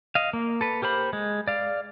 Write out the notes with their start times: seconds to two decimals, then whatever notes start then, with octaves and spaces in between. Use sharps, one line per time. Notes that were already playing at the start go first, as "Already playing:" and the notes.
0.15 D#5 F5
0.33 A#3
0.61 A4 B4
0.82 G4 A#4 C5 B5
1.13 G#3
1.48 D5 F5